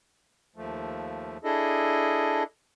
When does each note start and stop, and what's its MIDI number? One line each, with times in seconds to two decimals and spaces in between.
0.56 1.37 39
0.56 1.37 53
0.56 1.37 57
1.44 2.43 62
1.44 2.43 64
1.44 2.43 68
1.44 2.43 69
1.44 2.43 75